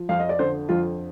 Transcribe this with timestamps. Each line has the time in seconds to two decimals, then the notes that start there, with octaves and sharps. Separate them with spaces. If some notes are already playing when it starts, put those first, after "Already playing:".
Already playing: F3
0.09 F2 F5
0.19 D#5
0.29 D5
0.39 D3 C5
0.69 F2 F4